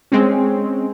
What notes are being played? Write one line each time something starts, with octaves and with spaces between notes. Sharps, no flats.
G#3 C4 C#4